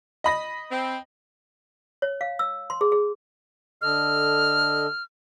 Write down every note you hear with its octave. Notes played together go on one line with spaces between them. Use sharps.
D#5 B5 A#6
C4
C#5
F5
E6
C6
G#4
G#4
D3 A4 D#5 F6